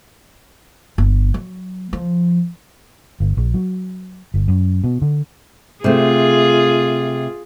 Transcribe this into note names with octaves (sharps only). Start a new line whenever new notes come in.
G1
F#3
F3
G1
A#1
F#3
G1
F#2
B2
D3
C3 A3 F4 G#4